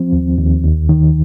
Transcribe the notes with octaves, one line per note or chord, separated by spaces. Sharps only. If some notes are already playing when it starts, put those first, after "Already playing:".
Already playing: F3 C4
D#2
D#2
D#2
D#3